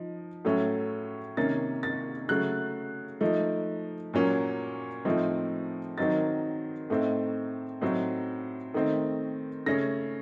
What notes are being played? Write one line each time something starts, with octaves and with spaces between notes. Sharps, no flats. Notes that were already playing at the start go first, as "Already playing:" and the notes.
Already playing: F3 D#4
A2 F#3 A3 C#4
C3 D#3 A#3 C#4 A6
A6
C#3 F#3 A3 F#6
F3 A3 D#4
A#2 F#3 A#3 C#4
A2 F3 A3 C4 D#4
D#3 F#3 C4 D#4 A6
A2 A3 C4 D#4
A2 F#3 C4 D#4
D#3 A3 C4 D#4
C#3 A3 C#4 A#6